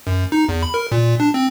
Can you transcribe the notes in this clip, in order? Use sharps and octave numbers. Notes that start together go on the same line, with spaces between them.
F#2
D#4
E2
B5
A#4
A#2
D4
C4